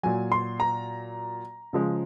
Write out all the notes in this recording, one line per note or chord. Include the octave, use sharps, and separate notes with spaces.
A#2 F#3 G#5
C6
A#5
C#3 F3 G#3